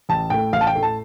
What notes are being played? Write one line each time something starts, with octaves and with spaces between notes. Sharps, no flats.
A1 A5
A2 A3 G5
A1 F5
A5
G5
A2 A3
A5